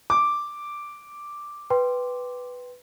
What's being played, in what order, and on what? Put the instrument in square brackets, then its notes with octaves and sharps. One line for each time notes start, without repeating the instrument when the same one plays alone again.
[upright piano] D6
[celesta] B4 G5 C6